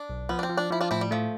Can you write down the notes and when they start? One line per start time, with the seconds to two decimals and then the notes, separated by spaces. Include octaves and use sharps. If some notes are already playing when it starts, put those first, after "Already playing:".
Already playing: D4
0.10 B1
0.29 F3 B3
0.39 D4
0.43 C4
0.49 F3
0.58 D4
0.71 F3 E4
0.81 D4 F4
0.91 A2 C4 E4
1.01 G3
1.11 F3 A3